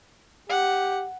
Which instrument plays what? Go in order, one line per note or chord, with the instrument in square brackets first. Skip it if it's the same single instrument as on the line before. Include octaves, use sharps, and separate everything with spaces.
[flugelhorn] G4 [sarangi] F#5